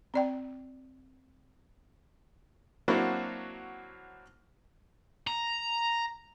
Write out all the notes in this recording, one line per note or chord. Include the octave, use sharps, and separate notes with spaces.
C4 D5 G5
F#3 A#3 C4 D4 E4 F#4
A#5